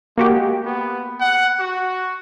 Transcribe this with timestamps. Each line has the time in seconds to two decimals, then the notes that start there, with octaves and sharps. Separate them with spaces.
0.17 G#3 A#3 F#4 G4
0.65 B3
1.21 F#5
1.59 F#4